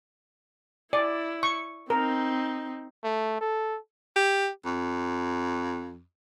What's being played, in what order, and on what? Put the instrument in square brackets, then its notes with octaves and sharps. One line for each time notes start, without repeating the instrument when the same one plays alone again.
[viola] E4 [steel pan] D5
[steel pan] C#6
[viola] C4 D#4 [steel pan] A#4
[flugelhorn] A3
A4
[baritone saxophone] G4
F2